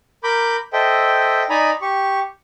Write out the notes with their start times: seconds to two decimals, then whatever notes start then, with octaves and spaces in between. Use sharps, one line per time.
0.24 A#4 B5 D6 G6
0.73 A4 C5 D#5 E5 G5
1.50 D#4 D5 D#5 G#5 A#5 B5
1.82 G4 C#6